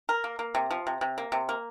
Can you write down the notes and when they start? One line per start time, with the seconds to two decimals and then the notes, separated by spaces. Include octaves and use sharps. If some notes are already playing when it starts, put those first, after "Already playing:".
0.09 A#4
0.24 A#3
0.39 A#3
0.55 C3
0.71 F3
0.87 C3
1.01 C3
1.18 A#3
1.32 C3
1.49 A#3